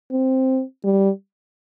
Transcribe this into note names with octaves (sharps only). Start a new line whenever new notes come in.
C4
G3